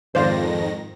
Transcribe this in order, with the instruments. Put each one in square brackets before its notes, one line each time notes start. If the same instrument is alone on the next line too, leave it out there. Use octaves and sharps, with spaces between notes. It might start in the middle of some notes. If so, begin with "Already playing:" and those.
[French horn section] F2 [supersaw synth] G#2 D#3 A#6 [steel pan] C5 D5 F5